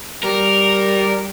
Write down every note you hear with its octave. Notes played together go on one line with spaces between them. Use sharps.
G3 A#4